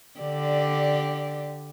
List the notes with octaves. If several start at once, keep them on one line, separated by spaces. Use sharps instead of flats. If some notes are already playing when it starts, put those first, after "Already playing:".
D3 G4 D5